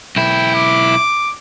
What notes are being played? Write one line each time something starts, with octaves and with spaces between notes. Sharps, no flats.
B1 E4 G5
D6